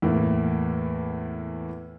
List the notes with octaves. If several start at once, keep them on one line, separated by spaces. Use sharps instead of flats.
E2 A2 A#3